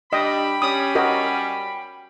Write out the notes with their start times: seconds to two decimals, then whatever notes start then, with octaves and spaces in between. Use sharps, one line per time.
0.13 G3 D4 D#5 G5 B5
0.62 G3 C#4 D#6
0.95 F#4 A#4 D#5